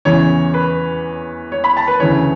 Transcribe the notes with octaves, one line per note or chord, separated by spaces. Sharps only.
E2 C#3 E3 C#5
B4
C#5
B5
A5
B4
D2 C#3 E3 C#5